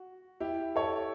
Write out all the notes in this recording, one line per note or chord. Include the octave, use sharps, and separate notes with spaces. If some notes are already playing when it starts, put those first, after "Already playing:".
Already playing: F#4
E4 G4
A4 C#5